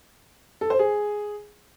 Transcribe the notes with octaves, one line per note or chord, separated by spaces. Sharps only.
A4
C5
G#4